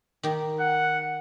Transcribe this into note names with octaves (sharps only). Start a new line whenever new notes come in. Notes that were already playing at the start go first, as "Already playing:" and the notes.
D#3 G4
F#5